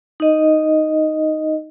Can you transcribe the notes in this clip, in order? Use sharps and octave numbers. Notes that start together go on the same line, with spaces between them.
D#4 D#5